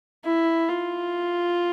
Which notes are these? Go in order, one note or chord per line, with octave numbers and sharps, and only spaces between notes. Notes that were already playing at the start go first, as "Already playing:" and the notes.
E4
F4